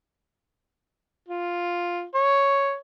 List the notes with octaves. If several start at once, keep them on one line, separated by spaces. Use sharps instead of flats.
F4
C#5